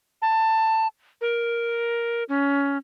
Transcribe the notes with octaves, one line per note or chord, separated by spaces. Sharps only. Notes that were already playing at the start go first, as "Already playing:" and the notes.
A5
A#4
C#4